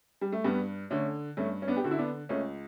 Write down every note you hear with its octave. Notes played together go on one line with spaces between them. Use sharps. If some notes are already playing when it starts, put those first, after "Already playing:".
G3
A3
G2 G3 B3
D3 A3 C#4
G2 A3 C#4
C#4
B3 D4
G4
D3 F#4
E4
B3 D4
C#2 A3 C#4